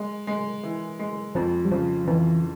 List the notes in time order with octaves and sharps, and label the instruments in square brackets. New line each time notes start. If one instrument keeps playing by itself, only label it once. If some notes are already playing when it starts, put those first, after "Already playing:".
Already playing: [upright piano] G#3
G#3
E3
G#3
[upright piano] F2 [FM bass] F3
[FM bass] G3
[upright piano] C#3 [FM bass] F3
[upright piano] F2 [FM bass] E3